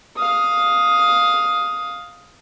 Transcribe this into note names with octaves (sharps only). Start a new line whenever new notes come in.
F5 D#6